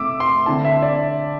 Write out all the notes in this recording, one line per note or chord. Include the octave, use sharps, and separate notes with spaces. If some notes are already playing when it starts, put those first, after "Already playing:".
Already playing: C3 A3 E4 E5 D6 E6
C6
D3 C4 E4 A5
E5
D5